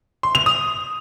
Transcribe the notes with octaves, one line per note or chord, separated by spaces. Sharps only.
C6
F7
D#6